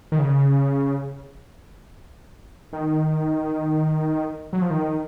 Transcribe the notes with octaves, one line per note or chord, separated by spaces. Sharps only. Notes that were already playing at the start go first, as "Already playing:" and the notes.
D#3
C#3
D#3
F#3
F3
D#3